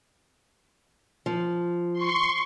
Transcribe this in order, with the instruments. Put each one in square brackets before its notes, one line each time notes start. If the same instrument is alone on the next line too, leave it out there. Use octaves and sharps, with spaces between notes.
[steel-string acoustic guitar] F3
[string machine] C6 C#6